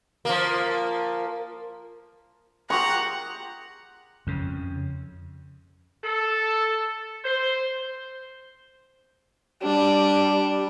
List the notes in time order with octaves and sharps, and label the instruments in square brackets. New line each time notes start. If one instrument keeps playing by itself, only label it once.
[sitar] F3 A#3
[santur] F4 G4 G#4 [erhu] F#5 [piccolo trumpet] A#5 [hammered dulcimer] C#6
[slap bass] F2 C#3
[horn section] A4
C5
[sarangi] G3 [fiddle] D4